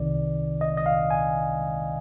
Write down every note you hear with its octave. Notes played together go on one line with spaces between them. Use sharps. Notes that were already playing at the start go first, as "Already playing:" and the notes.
Already playing: C2 C3 D#3 D5
D#5
D#5
F5
G#5